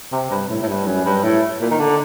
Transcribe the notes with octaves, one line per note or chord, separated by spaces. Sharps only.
C3
G2
A2
A2
G2
F#2
G2
A2
A#2
D#3
D3